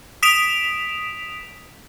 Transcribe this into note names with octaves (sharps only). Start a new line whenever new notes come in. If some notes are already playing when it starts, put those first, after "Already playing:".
D#6 B6 D7 E7 F7